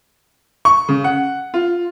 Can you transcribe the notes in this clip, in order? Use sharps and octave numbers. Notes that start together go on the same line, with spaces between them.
C#6
C#3
F#5
F4